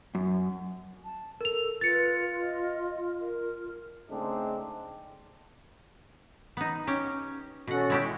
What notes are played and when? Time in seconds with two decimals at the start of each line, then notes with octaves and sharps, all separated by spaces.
0.15 F#2
1.05 A5
1.41 A4 A#4 F7
1.81 F4 B4 A6 C#7
2.40 D#5
3.20 A#4
4.10 C#3 G#3 A3 C4 D4 D#4
6.57 B3 D#4
6.87 C#4 G4
7.67 B2 C#4 F#4 A4 F#5
7.90 G#3 E4 G4